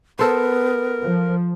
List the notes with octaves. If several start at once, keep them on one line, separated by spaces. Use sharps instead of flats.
B3 A4 A#4 C5
F3